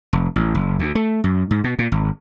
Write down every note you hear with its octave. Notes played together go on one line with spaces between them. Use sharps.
F1
A1
F#1
D2
A3
F#2
G#2
B2
A#2
G#1